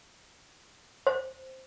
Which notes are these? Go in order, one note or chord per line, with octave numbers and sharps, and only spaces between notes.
C5